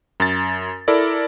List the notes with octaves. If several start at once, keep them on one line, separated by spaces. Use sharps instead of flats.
F#2 A6
E4 A4 A#4 D5